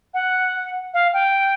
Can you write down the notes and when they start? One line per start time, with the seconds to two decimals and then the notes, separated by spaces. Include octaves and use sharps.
0.14 F#5
0.94 F5
1.13 G5